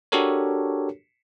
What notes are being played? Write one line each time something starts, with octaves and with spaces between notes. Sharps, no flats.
D4 F#4 G4 A4 A#4 C#5